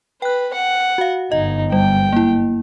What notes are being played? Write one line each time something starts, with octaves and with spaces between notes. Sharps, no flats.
B4 G5 F#6
F#5
F#4 F5
G1 F#2 D#4 D#5
G3 G5
A#3 E4